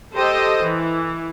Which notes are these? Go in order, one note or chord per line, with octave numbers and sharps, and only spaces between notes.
G4 A4 C5 D#5 G5
E3